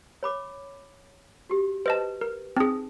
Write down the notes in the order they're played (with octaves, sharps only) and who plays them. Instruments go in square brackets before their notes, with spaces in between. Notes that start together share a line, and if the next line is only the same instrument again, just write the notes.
[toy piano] C#5 B5 D6
F#4 G4
[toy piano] B4 [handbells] C5 D#5 A5
[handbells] A#4
[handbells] C4 G#4 [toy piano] D#4